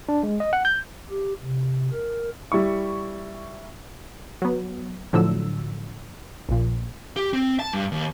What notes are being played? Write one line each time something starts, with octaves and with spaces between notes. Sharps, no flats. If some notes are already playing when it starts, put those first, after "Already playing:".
D4
G#3
D#5
F#5
G6
G4
C3
A#4
G3 E4 C#6
F#3 B3
A2 D3 F3 F#3 E6
A#1 A#2
G4
C4
A5
G2
D#2